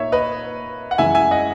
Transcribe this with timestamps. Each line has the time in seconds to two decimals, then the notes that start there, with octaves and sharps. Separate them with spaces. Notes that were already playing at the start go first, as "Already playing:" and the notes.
Already playing: A#2 A#3 D#4 C#5 E5
0.12 B4 D#5
0.91 F#5
0.98 F#2 E3 G#3 E5 G#5
1.15 E5 G#5
1.31 D#5 F#5